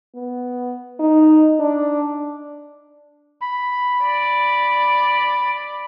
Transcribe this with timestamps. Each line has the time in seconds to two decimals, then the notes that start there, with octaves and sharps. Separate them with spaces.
0.15 B3
1.00 D#4
1.60 D4
3.41 B5
4.04 D5